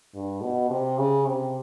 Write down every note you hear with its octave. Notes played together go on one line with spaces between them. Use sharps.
G2
B2
C3
C#3
C3